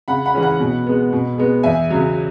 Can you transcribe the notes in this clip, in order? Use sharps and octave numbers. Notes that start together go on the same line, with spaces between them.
C#3 F#5 B5
F#5 B5
E3 G#3 C#4
F#5 B5
B2
G#3 B3
B2
G#3 B3
E2 E5 G#5
C#3 F#3